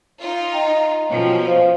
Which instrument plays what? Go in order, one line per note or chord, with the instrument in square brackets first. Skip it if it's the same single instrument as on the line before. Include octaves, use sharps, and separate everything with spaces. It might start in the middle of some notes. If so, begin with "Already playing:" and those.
[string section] D#4 F4
[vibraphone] D#5 G5 A#5
[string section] B2 F3 C#4
[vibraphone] C5 F5